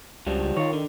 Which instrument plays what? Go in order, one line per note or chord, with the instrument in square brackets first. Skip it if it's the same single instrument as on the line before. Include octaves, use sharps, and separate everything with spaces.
[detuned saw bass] C#2 [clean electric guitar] G2 F3 G3
[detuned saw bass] C#2
[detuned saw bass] D#3 [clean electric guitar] F4 C#5
[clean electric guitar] D3